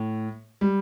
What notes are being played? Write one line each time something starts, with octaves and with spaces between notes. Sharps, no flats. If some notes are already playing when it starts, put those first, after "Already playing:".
Already playing: A2
G3